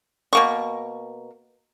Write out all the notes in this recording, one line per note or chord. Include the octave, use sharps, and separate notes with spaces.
B2 A#3 C#6